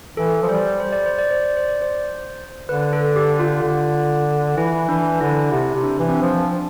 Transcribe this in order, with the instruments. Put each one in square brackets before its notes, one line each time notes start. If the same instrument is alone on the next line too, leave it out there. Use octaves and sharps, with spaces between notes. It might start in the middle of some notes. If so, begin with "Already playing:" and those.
[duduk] E3 [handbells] A4
[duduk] F3
[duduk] G3 [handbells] C5
[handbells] C5
D5
C5
D5
C5
D5
C5
D5
C5
[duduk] D3 [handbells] B4
[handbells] A4
G4
F4
[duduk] D3
[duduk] E3 [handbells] E4
[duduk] E3 [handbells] D4
[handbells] D4
[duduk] D3 [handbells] E4
[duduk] C3 [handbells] E4
[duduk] C3
[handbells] D4
[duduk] E3
[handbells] C4
D4
[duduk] F3